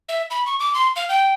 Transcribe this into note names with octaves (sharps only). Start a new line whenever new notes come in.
E5
B5
C#6
D6
C6
F5
G5